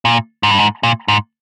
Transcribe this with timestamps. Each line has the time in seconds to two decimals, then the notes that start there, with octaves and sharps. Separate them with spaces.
0.05 A#2
0.43 G#2
0.51 G2
0.59 G#2
0.83 A#2
1.08 G#2